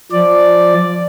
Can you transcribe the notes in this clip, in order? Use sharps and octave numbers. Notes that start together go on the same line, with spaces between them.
F3 D5